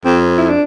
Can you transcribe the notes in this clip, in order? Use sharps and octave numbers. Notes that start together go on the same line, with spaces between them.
F2 C4
E4
D4